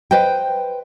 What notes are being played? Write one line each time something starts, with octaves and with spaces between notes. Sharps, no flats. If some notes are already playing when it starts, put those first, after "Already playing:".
B4 C5 D#5 G5